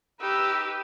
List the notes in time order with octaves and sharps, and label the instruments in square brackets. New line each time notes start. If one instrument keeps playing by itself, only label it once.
[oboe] D#4 [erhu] G4 [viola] B4 [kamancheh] E6